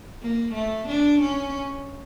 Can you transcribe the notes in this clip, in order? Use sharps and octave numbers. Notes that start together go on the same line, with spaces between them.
A#3
A3
D4
C#4